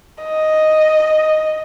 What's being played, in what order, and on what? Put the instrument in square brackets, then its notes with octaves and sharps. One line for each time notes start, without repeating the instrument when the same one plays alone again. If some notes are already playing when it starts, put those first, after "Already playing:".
[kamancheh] D#5